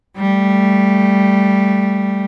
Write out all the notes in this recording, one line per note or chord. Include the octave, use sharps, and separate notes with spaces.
G3 A3